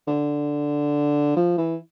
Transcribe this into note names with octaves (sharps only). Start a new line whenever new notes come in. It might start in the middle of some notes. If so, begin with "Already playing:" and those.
D3
F3
E3